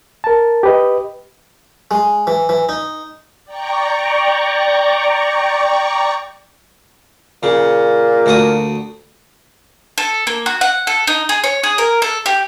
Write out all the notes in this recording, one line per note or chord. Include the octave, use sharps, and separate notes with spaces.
A#4 A5
G4 B4 D#5
G#3
E3
E3
D#4
D5 G5 A#5 C#6
A#2 C#3
D2 F#4 D#6
A4
A#3
F#4
F#5
A4
D#4
G#4
C#5
G#4
A#4
A4
G4